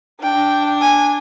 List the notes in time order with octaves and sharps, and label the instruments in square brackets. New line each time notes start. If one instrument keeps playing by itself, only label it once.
[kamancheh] D4 [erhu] G5
[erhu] G#5